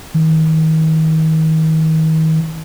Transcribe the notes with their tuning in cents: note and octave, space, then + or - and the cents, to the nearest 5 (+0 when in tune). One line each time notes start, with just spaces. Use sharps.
D#3 +35